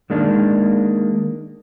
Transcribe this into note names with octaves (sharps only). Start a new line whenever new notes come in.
D#3 G#3 A#3 D4